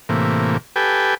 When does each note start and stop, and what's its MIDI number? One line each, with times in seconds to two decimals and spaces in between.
0.09 0.57 45
0.09 0.57 48
0.09 0.57 52
0.09 0.57 58
0.76 1.14 67
0.76 1.14 69
0.76 1.14 71
0.76 1.14 79
0.76 1.14 80